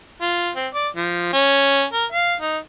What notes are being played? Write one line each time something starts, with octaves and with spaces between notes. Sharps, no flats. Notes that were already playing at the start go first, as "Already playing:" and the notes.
F4
C4
D5
F3
C#4
A#4
F5
D#4